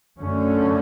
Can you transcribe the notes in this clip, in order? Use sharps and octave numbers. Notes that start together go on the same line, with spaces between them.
F#2 D3 A3 C#4